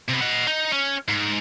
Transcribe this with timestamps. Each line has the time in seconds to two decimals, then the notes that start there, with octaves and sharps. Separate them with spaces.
0.08 C3 B3
0.21 D#5 F#5
0.47 D#4
0.72 C#4
1.09 G#2